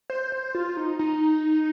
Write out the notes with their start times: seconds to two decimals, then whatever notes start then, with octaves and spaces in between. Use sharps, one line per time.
0.10 C5
0.32 C5
0.55 F4
0.77 D#4
0.99 D#4